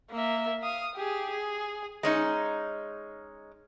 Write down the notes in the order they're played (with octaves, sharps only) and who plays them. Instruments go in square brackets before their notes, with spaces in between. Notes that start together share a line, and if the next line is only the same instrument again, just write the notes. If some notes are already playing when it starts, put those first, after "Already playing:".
[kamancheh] A#3 E5
F5 D#6
G4 G#4
G#4
[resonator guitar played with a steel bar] G#3 C#4 D#4